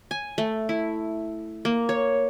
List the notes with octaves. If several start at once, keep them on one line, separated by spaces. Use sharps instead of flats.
G#5
A3
E4
A#3
C#5